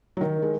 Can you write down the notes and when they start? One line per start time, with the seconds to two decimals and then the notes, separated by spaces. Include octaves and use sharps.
0.17 F#3
0.21 D#3 A#4
0.42 G#3